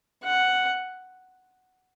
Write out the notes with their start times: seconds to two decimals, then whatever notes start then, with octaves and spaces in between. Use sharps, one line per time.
0.24 F#5